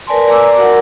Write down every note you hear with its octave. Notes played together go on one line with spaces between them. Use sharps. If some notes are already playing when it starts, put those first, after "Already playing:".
A#4 B4 D5 G#5 A5 C6
D5 G#5 A#5 D6 E6
F#4 A#4 F#5